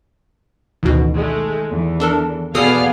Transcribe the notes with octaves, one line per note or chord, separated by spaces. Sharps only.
A1 D2 B2 D#3
G#3 A3
E2
D4 A4 A#4
B2 B3 G#4 A4 D5 F5 D#6 F6